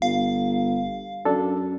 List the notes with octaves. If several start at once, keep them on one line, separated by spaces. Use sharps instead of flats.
G1 F5
F#2 D4 A4